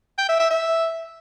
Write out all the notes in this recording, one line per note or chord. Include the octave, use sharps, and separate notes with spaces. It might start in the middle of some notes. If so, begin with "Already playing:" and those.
G5
E5
E5
E5